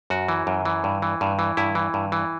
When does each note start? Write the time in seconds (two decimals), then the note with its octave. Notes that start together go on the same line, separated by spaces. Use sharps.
0.10 F#2 F#4
0.29 E3
0.47 F#2
0.65 E3
0.84 G2
1.02 E3
1.21 G2
1.39 E3
1.57 G2 E4
1.75 E3
1.94 G2
2.12 E3